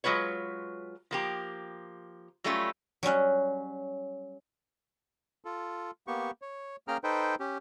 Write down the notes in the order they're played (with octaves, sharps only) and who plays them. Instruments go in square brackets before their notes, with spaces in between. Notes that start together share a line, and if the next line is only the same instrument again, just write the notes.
[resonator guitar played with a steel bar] F#3 G#3 F4 B4 C#5
F3 A#3 G4
F#3 G3 A3 C#4 F4 A4
[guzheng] F#3 G3 C#4 F#5
[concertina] F4 A4
A#3 B3 G4 C#6
C#5
A#3 C#4 G#4 G5 A#5 F6
D#4 A4 B4 C5 G5
C#4 G4